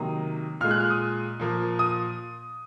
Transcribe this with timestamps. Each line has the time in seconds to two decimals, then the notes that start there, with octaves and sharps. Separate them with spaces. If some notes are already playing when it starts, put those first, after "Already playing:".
Already playing: C3 D#3 F#3 A#3 D#6
0.61 A#2 F6
0.64 G#3
0.71 F#6
0.81 F6
0.90 D#6
1.40 A#2 F3 A#3
1.79 D#6